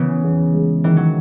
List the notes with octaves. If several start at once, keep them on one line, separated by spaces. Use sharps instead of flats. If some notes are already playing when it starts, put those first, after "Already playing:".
Already playing: C#3 E3 B3
E2
G#3
D#3 E3
F#3